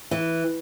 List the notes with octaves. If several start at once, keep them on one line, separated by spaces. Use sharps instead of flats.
E3